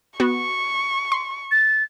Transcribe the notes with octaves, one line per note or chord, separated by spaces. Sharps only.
B3 F#4 C#6
C6
A6